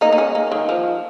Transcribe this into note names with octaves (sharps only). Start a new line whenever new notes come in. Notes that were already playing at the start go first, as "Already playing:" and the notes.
A#3 D#4
A#3
G#3 C#4
A#3
D#3
F3